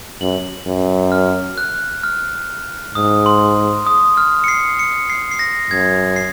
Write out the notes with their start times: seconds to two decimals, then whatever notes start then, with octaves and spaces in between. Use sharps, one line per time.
0.21 F#2 F#7
0.66 F#2
1.12 F6
1.58 F#6
2.03 F6
2.95 G#2 D#6
3.26 C6
3.87 D#6
4.17 F6
4.44 C#7
4.48 C7
4.79 C#7
5.10 C7
5.31 C7
5.39 A#6
5.70 F#2 G#6
6.16 C7